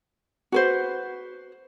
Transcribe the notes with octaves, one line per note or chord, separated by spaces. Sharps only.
F#4 B4 C5